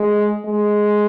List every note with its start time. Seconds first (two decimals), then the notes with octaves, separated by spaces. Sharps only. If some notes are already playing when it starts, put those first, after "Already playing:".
Already playing: G#3
0.45 G#3